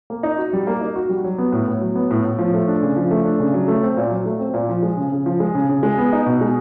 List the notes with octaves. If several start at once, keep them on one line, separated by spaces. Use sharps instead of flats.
A#3
D#4
F#4
G3
A#3
D#4
F#4
G3
F#3
B3
A2
A2
F#3
B3
A2
A2
F3
A3
D4
C#3
F3
A3
D4
C#3
F#3
A3
C4
A#2
F#3
A3
C4
A#2
F3
G#3
C#3
C#3
F3
G#3
C#3
C#3
G#3
B3
D#4
B2
G#3